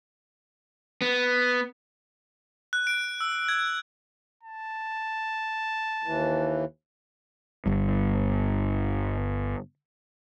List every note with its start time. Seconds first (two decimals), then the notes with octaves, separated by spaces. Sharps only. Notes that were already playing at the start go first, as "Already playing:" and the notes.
1.02 B3
2.73 F#6
2.87 D7
3.20 E6
3.48 G#6
4.43 A5
6.04 D#2 E3
7.66 G1 G2